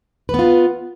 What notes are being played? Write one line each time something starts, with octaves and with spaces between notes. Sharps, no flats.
B3 F4 B4